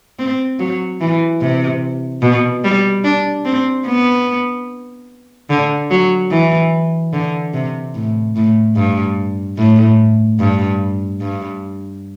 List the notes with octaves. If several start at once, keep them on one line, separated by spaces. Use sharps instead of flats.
C4
F#3
E3
C3
B2
G3
D4
C4
B3
D3
F#3
E3
D3
C3
A2
A2
G2
A2
G2
G2